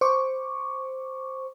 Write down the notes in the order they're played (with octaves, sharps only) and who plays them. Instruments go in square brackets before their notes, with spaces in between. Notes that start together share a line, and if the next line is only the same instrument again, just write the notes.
[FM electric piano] C5 C#6 D6